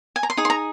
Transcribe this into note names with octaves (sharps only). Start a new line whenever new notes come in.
G#5
A#5
C6
D#4 G#4
C6
A#5